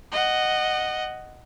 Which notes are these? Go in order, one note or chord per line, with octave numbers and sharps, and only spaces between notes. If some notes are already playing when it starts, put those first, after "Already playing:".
D#5 F#5